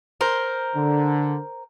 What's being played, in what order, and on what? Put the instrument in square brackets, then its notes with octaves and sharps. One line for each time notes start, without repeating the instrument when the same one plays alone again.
[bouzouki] A#4 C5
[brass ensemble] D3